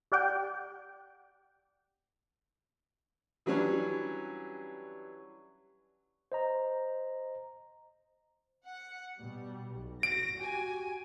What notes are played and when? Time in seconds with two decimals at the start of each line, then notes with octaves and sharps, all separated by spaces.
0.12 G4 D5 F#5 G5
3.46 E3 F#3 G3 C#4 D4
6.32 C5 D#5 A#5
8.65 F#5
9.17 B2 G3
9.74 B1
10.03 F#4 A#6 D7
10.36 F#4 G4 G#5